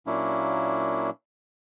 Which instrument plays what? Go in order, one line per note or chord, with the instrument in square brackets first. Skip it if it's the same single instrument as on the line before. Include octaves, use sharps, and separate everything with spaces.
[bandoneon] A#2 F#3 A#3 C#4 D4 E4